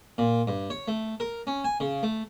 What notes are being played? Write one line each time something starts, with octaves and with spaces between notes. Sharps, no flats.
A#2
G2
C#5
A3
A#4
C#4
G#5
C#3
A3